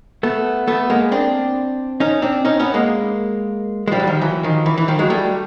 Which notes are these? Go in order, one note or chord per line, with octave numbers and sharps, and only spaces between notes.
A3 B3
A3 B3
G#3 A#3
C4 D4
C#4 D#4
C4 D4
C#4 D#4
B3 C#4
G#3 A#3
G#3
F3 G3
F#3
D#3 F3
E3 F#3
D#3 F3
E3
E3
D#3 F3
F#3 G#3
G3 A3